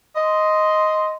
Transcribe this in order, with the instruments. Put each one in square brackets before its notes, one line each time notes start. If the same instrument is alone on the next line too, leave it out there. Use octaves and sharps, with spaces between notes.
[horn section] D#5 C6